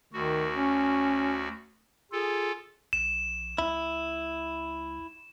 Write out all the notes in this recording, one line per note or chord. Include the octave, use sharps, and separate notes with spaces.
D2 D#3 F#4
C#4
F4 G#4 A4
A#1 E7
C#2 E4